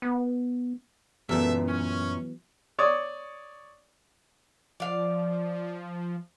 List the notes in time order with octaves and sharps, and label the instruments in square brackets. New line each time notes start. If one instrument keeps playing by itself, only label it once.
[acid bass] B3
[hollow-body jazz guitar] F#2 A#2 [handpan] E3 F#3 B3 [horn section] A4 E5
[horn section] C#4
[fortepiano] C#5 D5 C#6 D#6
[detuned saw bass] F3 [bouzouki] D5 F5